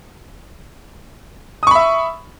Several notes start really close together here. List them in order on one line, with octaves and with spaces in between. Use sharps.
D#6 C#6 B5 E5